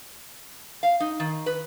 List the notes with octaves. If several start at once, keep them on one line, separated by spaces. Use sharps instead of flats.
F5
D#4
D#3
B4